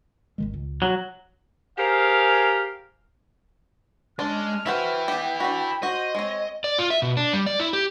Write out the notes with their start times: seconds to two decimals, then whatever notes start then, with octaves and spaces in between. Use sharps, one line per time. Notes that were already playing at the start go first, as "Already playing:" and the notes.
0.38 G#1 D#3 G#3
0.54 C#2
0.82 F#3
1.78 G4 G#4 A#4 C5 F5
4.19 G#3 C#4 D4 C6 F6
4.66 E3 E4 F#4 B4 C5 G5
5.08 B3 G4
5.40 D4 F#4 B5
5.83 F#4 C5 D#5 C6
6.15 G#3 C4 C#5
6.64 D5
6.79 F4
6.90 E5
7.02 B2
7.17 D4
7.33 G3
7.46 D5
7.60 E4
7.73 G4